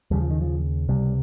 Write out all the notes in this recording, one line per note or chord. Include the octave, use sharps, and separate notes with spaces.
D#2 C#3 G3
F3
D#3
F3
C#2 C3 G3